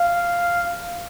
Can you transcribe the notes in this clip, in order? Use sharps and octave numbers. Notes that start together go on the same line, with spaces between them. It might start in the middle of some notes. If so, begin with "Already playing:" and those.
Already playing: F5